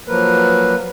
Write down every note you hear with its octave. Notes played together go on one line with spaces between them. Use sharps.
F3 F#3 A#3 A#4 B4